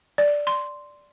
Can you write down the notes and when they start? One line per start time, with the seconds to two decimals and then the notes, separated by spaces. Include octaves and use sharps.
0.18 D5
0.47 C6